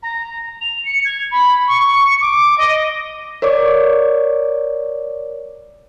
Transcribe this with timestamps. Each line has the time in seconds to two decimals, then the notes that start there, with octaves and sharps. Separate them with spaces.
0.02 A#5
0.61 F7
0.84 C#7
1.04 G#6
1.31 B5
1.67 C#6
2.04 C#7
2.20 D6
2.58 D#5
3.42 A#4 C#5 D5 D6